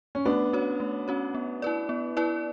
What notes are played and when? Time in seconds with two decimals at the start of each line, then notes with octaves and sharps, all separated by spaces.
0.15 C#4
0.25 A3 B3 D4
0.53 C#4 F#4 C#5
0.80 A3
1.08 C#4 F#4 C#5
1.35 B3
1.62 E4 B4 D5
1.89 B3
2.17 E4 B4 D5